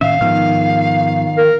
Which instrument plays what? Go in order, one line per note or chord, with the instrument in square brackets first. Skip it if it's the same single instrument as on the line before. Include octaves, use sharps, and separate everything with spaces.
[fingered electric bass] A2 D#3 C#4 [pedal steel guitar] E5 [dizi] F5
[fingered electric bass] G#2 F3 B3 [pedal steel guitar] D#3 F6
[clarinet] A#4